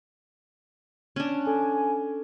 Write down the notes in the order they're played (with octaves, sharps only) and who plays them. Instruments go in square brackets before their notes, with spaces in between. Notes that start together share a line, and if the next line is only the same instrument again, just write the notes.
[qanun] C#4 D4
[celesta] A4 [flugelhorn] G#5